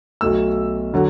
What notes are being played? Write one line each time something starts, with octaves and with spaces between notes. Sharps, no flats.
B1 B2 A3 E6
D3 F#3